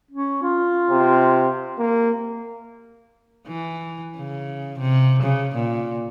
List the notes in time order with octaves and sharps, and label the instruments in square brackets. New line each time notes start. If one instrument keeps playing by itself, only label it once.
[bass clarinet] C#4
F4
[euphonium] C3
A#3
[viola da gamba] E3
C#3
C3
C#3
A#2